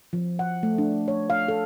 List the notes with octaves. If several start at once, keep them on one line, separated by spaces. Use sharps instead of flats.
F3
F#5
A3
D4
C#5
F5
A4